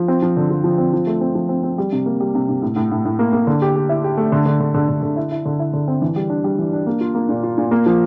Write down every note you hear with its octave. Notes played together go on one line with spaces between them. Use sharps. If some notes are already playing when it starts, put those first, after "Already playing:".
Already playing: F3
C4
F3
D3
F3
F3
C4
F3
A3
C4
F3
C4
C4
G3
C3
A#3
G3
C3
C3
A2
A2
A2
A2
A#3
A#3
D3
G4
G4
E4
G4
A3
D3
D3
D3
D3
D3
D3
E4
E4
D3
E4
D3
C4
E3
G3
D4
G3
E3
D4
A#3
F4
A#3
A#2
F4
A#2
A#3
F3